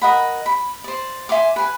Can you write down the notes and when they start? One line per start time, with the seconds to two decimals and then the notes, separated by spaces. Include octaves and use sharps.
0.02 A#4 D#5 F#5 B5
0.46 B5
0.84 C5 D5
1.29 E5 G#5 C6 D6
1.56 B4 G#5